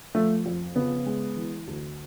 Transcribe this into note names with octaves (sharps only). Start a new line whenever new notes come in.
F3 A3
F2
C#3 B3
G#3
E3
D2